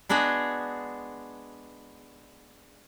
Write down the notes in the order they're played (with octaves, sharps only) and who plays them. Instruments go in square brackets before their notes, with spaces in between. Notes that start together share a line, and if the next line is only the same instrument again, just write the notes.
[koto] G#3 B3 D4 F#4 G#4